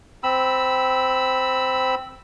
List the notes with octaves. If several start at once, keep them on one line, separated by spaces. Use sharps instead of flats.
C4 B5 E6